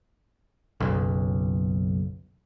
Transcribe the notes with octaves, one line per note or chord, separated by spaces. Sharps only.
F#1 B1